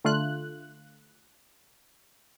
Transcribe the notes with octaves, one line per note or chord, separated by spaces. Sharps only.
D3 A3 F4 F#6